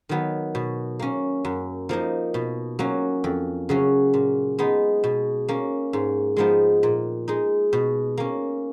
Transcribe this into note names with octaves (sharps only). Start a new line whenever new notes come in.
D#3 F#3 B3
B2
A#3 C#4
F#2
F3 A#3 D#4
B2
F#3 A#3 C#4
F2
C#3 F#3 C#4
A#2
G#3 B3 D#4
B2
A#3 C#4
G#2
F3 G#3 B3 D#4
A#2
G#3 D#4
B2
A#3 C#4